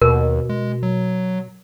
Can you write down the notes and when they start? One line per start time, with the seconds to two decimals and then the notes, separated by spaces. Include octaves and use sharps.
0.02 D#2 B2 A#4
0.49 G#3
0.83 F#3